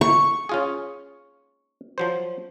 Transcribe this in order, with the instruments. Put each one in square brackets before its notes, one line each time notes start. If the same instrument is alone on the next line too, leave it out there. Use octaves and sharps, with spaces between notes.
[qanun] C#6
[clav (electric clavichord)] C#4 F4 G#4
F3 F#3 C5